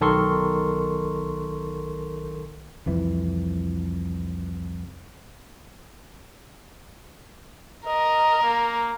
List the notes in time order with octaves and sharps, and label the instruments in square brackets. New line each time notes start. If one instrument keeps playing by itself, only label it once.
[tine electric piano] B1 D#3 A4 A#4 C6 C#6
[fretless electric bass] C2 F2 E3
[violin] A#4 [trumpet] D#5
[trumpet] A#3